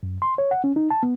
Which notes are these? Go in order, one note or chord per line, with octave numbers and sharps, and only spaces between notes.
F#2
C6
C#5
F#5
C#4
D#4
A5
B3